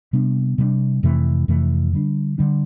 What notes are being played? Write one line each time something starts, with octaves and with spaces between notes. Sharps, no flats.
C3 G3 B3 D4
C3 G3 B3 D4
F2 C3 E3 A3
F2 C3 E3 A3
D3 G3 D4
D3 G3 D4